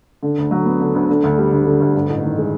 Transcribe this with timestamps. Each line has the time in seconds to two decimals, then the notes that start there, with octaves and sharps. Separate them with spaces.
0.22 D3
0.38 D2
0.51 F#3
0.66 B3
0.80 D3
0.95 D2
1.09 D3
1.24 D2
1.38 G3
1.52 D2
1.66 D3
1.80 D2
1.94 G2
2.09 A1
2.24 D#3
2.38 G#3